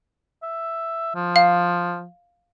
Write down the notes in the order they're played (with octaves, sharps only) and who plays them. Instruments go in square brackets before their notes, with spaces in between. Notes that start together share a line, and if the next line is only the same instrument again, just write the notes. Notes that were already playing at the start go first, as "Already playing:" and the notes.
[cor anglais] E5
F3
[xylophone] F5